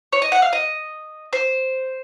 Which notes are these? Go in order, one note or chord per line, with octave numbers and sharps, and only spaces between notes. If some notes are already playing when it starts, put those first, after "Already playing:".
C#5
D#5
F#5
F5
D#5
C5